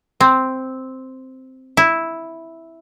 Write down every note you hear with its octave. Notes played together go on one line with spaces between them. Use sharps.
C4
E4